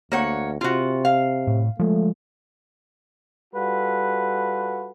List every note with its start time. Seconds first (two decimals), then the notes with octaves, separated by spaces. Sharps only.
0.12 D2 A#3 C#5 F#5
0.61 C3 F4 F#4
1.05 F5
1.47 A2
1.79 F3 G#3 A3
3.54 G3 F4 F#4 A4 B4